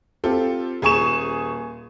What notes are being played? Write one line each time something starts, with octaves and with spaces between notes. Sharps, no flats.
C4 F4 G4 A4
D#1 G#4 G#5 C#6 E7